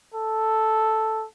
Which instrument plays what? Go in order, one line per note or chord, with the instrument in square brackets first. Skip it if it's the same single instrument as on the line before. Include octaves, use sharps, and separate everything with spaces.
[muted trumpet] A4